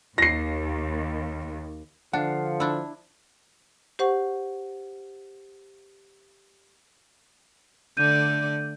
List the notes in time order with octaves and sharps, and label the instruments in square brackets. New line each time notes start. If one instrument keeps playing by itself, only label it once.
[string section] D#2 [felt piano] A#6 C7
[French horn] D3 [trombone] F3 [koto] D4 [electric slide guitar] F5 F#5
[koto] D4 E4
[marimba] G4 C5 F#5 C#6
[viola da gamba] D3 A3 D5 [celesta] G6 D#7